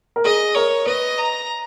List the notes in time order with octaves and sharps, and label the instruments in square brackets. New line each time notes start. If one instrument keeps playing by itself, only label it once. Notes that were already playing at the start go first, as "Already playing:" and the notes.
[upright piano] A#4
[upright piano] G#4 [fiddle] D#5
[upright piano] A#4 [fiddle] C#5
[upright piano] B4 [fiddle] D#5
[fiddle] A#5